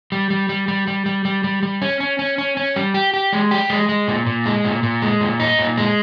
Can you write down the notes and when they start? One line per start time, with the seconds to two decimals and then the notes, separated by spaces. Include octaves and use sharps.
0.12 G3
0.30 G3
0.49 G3
0.68 G3
0.87 G3
1.06 G3
1.25 G3
1.44 G3
1.63 G3
1.82 C#4
2.00 C#4
2.19 C#4
2.38 C#4
2.57 C#4
2.76 G3
2.94 G4
3.14 G4
3.33 G#3
3.51 G4
3.70 G#3
3.89 G#3
4.08 A#2
4.27 A#2
4.46 G#3
4.65 A#2
4.83 A#2
5.02 G#3
5.21 A#2
5.40 D#4
5.59 A#2
5.78 G#3